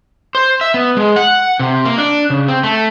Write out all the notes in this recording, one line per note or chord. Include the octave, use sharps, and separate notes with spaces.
C5
E5
B3
G#3
F#5
C3
A#3
D4
C#3
C4
A3